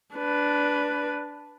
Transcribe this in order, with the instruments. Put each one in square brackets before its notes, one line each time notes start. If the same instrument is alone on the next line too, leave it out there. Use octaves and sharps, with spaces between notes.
[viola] D4 B4